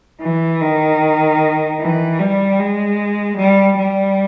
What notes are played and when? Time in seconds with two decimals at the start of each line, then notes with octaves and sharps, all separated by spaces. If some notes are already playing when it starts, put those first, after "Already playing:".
0.21 E3
0.61 D#3
1.80 E3
2.19 G3
2.59 G#3
3.38 G3
3.78 G3